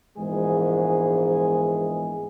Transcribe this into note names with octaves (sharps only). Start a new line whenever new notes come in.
A#1 G#2 E3 G#3 B3 G#4